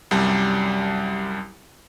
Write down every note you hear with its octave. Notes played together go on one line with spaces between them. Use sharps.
C2 F#2 G3 A5